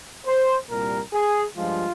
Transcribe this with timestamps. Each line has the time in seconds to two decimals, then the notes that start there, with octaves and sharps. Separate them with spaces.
0.26 C5
0.69 C2 A#2 G3 A#4
1.13 G#4
1.56 G2 F3 G#3 F4